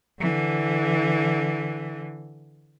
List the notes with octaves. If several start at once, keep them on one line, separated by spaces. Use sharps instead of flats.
D3 E3